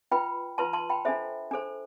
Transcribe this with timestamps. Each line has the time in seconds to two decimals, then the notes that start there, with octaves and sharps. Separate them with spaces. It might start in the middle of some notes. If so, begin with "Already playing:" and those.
0.11 F4 B4 G5 B5
0.58 F4 B4 A5 C6
0.73 A5 C6
0.89 G5 B5
1.05 D4 A4 C5 E5
1.51 D4 A4 C5